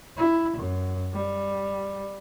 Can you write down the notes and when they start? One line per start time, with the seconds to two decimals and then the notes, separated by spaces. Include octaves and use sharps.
0.17 E4
0.57 F#2
1.13 G3